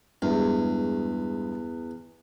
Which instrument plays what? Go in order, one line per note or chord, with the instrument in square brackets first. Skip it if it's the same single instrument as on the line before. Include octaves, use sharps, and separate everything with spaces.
[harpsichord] E2 [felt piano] G2 G#3